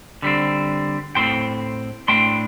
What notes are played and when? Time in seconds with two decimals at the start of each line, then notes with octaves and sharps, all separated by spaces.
0.22 D3 G3 C4
1.15 A2 A3 C4 G5 C6
2.08 A2 A3 D4 G5 C6